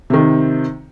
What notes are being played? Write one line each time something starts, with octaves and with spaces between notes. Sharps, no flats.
C3 D#3